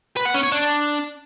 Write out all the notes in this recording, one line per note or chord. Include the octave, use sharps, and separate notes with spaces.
B4
F#5
C#4
C#5
D4